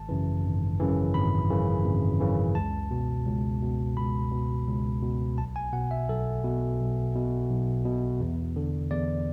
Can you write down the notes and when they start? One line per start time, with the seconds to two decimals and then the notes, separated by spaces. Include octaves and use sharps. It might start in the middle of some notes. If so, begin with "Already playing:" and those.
Already playing: G#1 A5
0.09 F#2 C#3 E3
0.44 G#1
0.80 F#2 C#3 E3
1.14 G#1 B5
1.50 F#2 C#3 E3
1.85 G#1
2.20 F#2 C#3 E3
2.55 C#2 A5
2.91 B2
3.26 C#2
3.62 B2
3.97 C#2 B5
4.32 B2
4.67 C#2
5.02 B2
5.38 B1 A5
5.56 G#5
5.73 B2 F#5
5.91 E5
6.09 B1 A4
6.44 B2
6.79 B1
7.15 B2
7.50 B1
7.85 B2
8.21 E2
8.56 D3
8.91 E2 D5